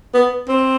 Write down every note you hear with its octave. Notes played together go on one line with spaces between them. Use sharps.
B3
C4